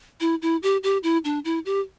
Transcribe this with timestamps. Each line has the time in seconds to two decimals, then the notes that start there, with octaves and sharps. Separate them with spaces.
0.20 E4
0.42 E4
0.63 G4
0.83 G4
1.03 E4
1.25 D4
1.45 E4
1.66 G4